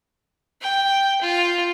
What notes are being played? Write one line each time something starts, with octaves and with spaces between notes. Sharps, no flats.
G5
F4